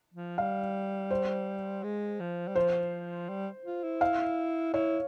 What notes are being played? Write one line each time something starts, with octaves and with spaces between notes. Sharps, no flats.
F3
G3 F5
C5
G#3
F3
G3
F3 C5
G3
F4
E4
F5
E4 C#5